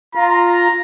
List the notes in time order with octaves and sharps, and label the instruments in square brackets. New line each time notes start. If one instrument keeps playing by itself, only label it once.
[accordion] F4 [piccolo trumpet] A#5